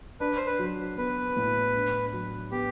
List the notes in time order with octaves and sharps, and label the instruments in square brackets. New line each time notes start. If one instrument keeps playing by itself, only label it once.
[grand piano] D4 [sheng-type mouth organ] B4
[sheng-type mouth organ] C5
B4
[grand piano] F#3
[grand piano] B3 [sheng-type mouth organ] B4
[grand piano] A2
D4
F#3
[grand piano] B3 [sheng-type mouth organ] G4